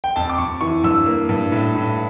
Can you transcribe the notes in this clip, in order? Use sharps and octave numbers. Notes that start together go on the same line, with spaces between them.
G5
F2 A5
D6
F2 C#6
E3 C#6
G2 E6
A#3
G2
A2
A2